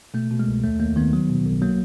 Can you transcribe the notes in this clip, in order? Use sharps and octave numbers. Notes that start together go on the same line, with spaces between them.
B2 A3
B2
G#3
C2
D#2 A3
D#2 A#3
D#3 B3
F#3
B2
B1
F#3 A#3